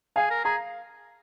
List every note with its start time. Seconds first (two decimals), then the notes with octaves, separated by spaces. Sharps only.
0.16 G#4 F5 G#5
0.30 A#4
0.44 G#4 A#5